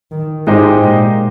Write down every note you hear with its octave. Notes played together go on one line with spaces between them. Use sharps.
D#3
G#2 G#3 D#4 G4 C5 D#5
A#2